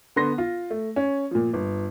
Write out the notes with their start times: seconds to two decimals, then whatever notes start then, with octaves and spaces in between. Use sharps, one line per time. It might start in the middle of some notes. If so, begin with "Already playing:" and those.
0.16 D3 B3 C6 A#6
0.38 F4
0.70 A3
0.96 C#4
1.31 A#2 F3
1.53 G1